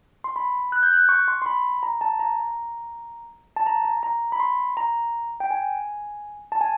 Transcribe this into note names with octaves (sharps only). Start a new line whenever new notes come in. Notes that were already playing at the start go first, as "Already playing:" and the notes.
C6
B5
F#6
G6
F#6
C#6
C6
C6
B5
A#5
A5
A#5
A5
A#5
A#5
A#5
B5
C6
A#5
G5
G#5
A5
G#5